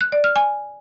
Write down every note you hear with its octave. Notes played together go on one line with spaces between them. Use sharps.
F#6
D5
F6
G#5